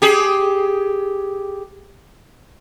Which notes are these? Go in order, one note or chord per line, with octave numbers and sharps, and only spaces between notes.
G4 G#4